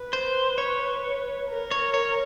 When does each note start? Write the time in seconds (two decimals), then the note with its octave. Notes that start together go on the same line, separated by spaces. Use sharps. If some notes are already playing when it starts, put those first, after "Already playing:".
Already playing: B4
0.13 C5
0.58 C#5
1.50 A#4
1.71 C#5
1.94 C#5